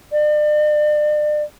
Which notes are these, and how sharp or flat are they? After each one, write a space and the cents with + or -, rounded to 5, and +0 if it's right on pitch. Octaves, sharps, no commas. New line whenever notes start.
D5 +40